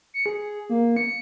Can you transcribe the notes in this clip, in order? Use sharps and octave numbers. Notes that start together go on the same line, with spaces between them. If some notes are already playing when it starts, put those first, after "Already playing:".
C#7
G#4
A#3
C#7